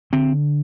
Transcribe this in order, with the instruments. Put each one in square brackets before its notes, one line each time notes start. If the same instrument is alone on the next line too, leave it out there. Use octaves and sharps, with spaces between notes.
[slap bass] D3 C4